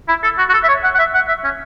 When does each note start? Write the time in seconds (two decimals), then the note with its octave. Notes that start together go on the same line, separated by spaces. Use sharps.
0.08 E4
0.23 A4
0.38 F#4
0.49 F#4
0.53 A4
0.64 E5
0.68 C#5
0.84 F#5
0.95 F#5
0.99 E5
1.14 F#5
1.28 E5
1.44 C#4